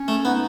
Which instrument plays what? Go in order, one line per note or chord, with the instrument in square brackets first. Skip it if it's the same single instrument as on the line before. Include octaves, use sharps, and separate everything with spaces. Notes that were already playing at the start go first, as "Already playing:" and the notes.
Already playing: [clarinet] C#4
[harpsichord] A3
[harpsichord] B3 [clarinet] D#4